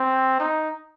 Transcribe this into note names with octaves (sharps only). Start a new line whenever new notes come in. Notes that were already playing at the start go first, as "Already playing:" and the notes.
Already playing: C4
D#4